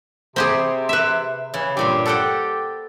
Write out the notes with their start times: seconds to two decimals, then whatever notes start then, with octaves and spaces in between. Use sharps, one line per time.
0.36 C3 C4 G4 G#4 C5 B5
0.89 B4 E5
1.54 C#3 E3
1.77 G2 A#2 G4 C5
2.06 A4 F#5 G5